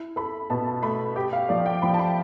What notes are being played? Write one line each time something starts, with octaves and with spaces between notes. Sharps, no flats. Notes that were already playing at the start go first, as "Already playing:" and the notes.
Already playing: E4
A4 B5
B2 A5
A5
A3 B5
G4 G5
F5
F3 D5
G5
F3 B5
A5
B5